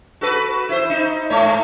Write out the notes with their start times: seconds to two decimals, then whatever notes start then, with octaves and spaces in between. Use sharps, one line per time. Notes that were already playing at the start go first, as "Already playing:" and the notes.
0.21 F#4 A4 B4
0.69 E4 C5
0.90 D#4
1.30 G#2 A3 C#5